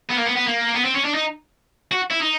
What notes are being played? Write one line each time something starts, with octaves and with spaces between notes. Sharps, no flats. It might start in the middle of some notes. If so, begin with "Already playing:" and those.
B3
A#3
B3
B3
A#3
B3
C4
C#4
D4
D#4
F#4
E4
D#4